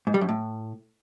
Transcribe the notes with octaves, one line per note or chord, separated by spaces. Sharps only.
G#2
G3
F#2
A2